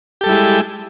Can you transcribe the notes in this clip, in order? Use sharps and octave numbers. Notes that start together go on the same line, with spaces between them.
G3 G#3 E4 G4 A4